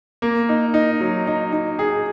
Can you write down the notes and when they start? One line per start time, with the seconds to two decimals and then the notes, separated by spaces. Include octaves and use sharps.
0.22 A#3
0.49 D#4
0.74 D#4
1.01 F#3
1.27 D#4
1.52 D#4
1.79 G#4